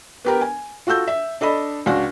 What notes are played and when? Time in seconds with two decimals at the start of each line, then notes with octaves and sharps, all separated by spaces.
0.25 B3 G4 A#4
0.41 G#5
0.87 F4 F#4 A4 E6 G6
1.08 E5
1.41 D4 A4 D#5 B5
1.86 C#2 D4 F#4